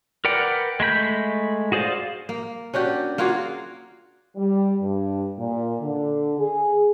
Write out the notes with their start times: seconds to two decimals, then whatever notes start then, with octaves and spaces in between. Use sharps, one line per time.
0.25 A#4 B4 D5 F#5 G5
0.80 G#3 A3 B5 G6
1.72 F#4 G#4 C5 D5 F5
2.29 A#3
2.74 C#4 D4 F#4 G4
3.18 A#3 F4 F#4 G#4
4.37 G3
4.81 G2
5.38 A#2
5.81 D3
6.39 G#4